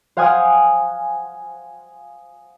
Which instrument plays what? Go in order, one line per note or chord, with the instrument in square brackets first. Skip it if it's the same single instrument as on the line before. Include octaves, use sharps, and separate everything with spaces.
[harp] C5 F5 F#5 G#5 D#6 F6